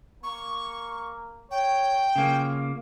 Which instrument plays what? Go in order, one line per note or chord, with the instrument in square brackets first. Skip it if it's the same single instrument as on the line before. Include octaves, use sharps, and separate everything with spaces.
[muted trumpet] A#3 [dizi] C#6
[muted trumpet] C#5 [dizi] G5
[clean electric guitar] C#3 A#3 [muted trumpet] F4